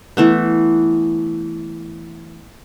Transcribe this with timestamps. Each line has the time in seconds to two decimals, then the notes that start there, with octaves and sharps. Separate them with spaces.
0.17 E3 A3 B3